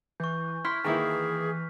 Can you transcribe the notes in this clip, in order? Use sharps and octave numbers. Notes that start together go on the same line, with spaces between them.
E3 C#6 G6
E4 C6 F6 B6
D#3 E3 A#3 E4 G#4